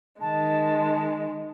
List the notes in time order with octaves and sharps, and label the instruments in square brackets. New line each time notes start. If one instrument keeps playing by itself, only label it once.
[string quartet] D#3 G#3 [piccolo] A5